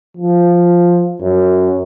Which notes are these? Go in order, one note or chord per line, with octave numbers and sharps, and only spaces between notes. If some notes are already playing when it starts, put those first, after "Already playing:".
F3
F#2